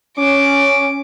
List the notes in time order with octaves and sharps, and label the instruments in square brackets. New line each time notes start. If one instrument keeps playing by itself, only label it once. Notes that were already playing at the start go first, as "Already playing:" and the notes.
[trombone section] C#4 [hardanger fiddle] D6